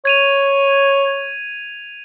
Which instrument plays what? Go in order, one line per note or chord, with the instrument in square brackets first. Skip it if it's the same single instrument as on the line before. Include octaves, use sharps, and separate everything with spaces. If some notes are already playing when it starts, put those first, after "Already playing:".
[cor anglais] C#5 [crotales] G#6 D#7 F7